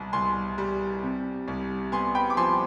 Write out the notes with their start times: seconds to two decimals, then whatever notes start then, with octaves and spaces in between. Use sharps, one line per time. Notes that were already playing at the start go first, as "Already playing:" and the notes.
Already playing: C2 B2
0.13 C2 G#5 C6
0.58 G3
1.03 C3
1.48 C2
1.92 B3 G#5 C6
2.15 G5 B5
2.30 D6
2.37 F3 G#5 C6